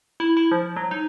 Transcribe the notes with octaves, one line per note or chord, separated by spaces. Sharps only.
E4
E4
F3
F#3
D#4